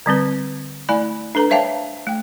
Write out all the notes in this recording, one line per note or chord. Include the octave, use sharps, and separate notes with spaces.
D3 G3 C4 B4
A3 E4 D5 G#5 B5
D4 A4 B4 A#5
C5 C#5 E5 F5 G5 A5
A3 G5